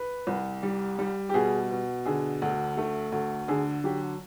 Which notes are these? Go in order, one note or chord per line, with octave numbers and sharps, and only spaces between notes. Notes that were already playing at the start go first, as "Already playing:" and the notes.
Already playing: B4
C2
G3
G3
G4
B2 G#4
B2
D3 G#4
D2
A3
D2
D3 G#4
F#3 G4